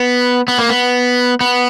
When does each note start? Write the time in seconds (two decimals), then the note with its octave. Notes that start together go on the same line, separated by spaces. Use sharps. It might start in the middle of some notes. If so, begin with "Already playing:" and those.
Already playing: B3
0.48 B3
0.59 A#3
0.69 B3
1.41 B3